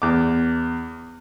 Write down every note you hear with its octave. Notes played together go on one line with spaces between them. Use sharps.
E2 D6